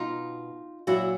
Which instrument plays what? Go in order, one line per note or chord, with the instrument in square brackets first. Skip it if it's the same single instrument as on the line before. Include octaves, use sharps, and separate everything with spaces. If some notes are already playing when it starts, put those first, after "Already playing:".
Already playing: [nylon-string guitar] B2 D#4 F4
A#2 F#3 E4 F#4